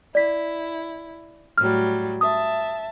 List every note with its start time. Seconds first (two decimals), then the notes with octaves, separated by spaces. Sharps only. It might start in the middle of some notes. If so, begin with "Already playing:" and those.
0.15 E4 D5 B6
1.58 A2 F#3 G3 F6
2.21 E5 A5 D#6